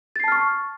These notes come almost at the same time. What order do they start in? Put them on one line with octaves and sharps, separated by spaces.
A6 C7 A5 F6 C#6